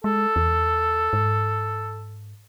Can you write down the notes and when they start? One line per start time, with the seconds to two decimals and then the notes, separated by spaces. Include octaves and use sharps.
0.04 G#3 A4
0.36 E2
1.13 G#2